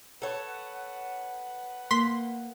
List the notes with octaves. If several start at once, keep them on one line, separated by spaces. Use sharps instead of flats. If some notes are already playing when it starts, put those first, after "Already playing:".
A4 B4 C#5 F#5
A#3 C6 B6